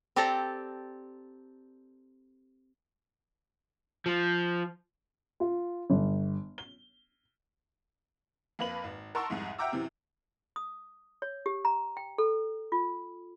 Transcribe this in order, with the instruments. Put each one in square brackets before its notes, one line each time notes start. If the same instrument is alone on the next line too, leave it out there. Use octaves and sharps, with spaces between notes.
[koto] C4 G4 A4 D5 A5 A#5
[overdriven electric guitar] F3
[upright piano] F4
G1
G7
[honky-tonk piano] F2 A#3 B4 F#7
G#1
A#4 F#5 A5 C6 C#6 E6
C2 F2 G#2
E5 F#5 G5 A#5 D6 E6
F#2 C3 E3
[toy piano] D#6
C#5
G4
A#5
G5
A4
F4